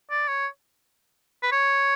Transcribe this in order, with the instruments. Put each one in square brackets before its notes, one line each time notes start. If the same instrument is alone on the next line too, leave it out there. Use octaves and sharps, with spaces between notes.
[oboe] D5
C#5
B4
C#5